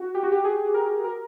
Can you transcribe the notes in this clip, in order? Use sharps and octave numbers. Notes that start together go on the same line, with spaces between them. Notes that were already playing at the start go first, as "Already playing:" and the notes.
Already playing: F#4
G4
F#4
G4
G#4
A#4
A#4